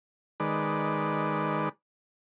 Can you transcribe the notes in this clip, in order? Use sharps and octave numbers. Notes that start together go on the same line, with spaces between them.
D#3 G#3 B4 D5